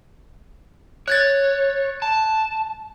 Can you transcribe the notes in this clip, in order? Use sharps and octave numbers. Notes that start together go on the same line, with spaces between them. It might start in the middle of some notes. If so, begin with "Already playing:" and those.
C#5 F#6 G#6 A6
A5